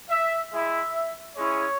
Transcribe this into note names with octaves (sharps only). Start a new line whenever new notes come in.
E5
G#3 E4 E5
G#3 C#4 E4 C#5